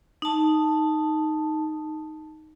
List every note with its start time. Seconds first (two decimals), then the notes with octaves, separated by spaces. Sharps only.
0.22 D#4 A5